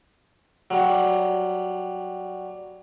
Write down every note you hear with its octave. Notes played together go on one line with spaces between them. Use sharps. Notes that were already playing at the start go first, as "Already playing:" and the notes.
F#3 G3